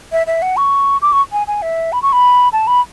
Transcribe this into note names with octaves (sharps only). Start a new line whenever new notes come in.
E5
E5
F#5
C#6
D6
C#6
G#5
G#5
E5
B5
C#6
B5
A5
B5